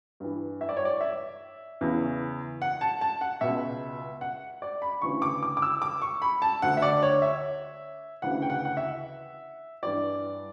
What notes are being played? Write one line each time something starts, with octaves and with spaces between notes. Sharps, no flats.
G2 E3
E5
D5
C#5
D5
E5
E2 C#3 E3
F#5
A5
A5
F#5
C#2 B2 E5
F#5
D5
B5
D2 C#3 E3 C#6
D6
D6
D6
E6
D6
C#6
B5
A5
D2 D3 F#5
E5
D5
C#5
E5
D2 C#3 E3 F#5
G5
F#5
F#5
E5
G2 E3 D5